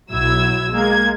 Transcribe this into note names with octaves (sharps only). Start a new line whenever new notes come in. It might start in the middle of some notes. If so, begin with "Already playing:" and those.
B1 F#3 E4 E6 G#6
G#3 A#3 G#6